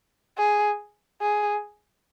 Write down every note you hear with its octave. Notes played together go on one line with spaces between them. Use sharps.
G#4
G#4